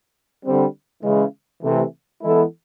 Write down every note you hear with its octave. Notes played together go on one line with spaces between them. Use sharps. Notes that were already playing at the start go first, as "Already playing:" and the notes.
D3 G3 C4
C#3 E3 G#3
C3 E3 A3
E3 G#3 B3 E4 A4